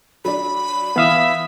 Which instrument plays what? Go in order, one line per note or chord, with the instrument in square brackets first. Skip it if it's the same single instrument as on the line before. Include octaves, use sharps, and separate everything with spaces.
[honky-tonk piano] F#3 D4 [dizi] B5
[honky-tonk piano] E3 [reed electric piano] B3 F5 D#6 [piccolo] E5